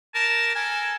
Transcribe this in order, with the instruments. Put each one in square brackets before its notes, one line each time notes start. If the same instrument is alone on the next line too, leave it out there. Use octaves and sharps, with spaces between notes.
[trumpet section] G4 A5 [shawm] A#4
[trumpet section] A4 A#4 A5 [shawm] G#5